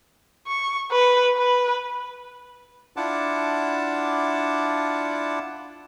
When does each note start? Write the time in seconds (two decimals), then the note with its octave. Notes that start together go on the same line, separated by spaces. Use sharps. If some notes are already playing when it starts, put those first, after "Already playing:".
0.47 C#6
0.92 B4
1.37 B4
2.97 D4 E4 F4 F#5 A5 D6